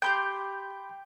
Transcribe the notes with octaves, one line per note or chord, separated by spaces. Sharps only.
G4 G5 B5 C6 G6